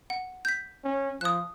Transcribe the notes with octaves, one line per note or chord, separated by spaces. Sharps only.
F#5
G6 B6
C#4
F3 D#6 F#6